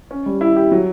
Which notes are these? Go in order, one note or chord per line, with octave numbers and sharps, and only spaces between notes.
C#4
G3
E4
G4
F#3